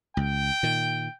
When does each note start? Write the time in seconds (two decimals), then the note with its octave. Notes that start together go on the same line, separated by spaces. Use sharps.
0.17 C#2 G5
0.63 A#2 D#3